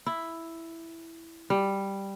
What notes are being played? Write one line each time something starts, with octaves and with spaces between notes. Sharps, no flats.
E4
G3